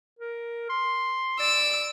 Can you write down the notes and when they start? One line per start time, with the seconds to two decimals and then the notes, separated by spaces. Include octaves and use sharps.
0.19 A#4
0.69 C6
1.40 D5 E6 D7